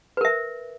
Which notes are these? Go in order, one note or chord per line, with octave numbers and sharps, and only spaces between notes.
A#4 B4 E5